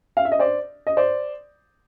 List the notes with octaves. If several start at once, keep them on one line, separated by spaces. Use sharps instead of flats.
F5
E5
D#5
C5 D5
D#5
C5 D5